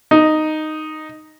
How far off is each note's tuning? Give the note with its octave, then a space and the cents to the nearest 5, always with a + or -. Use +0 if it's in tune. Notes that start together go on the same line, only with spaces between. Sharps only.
D#4 -5